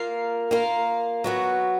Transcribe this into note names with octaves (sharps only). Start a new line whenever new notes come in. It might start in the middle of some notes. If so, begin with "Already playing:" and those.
Already playing: A#3 F4 A#4 F5
A#3 F4 A#4 F5
F#3 B3 F#4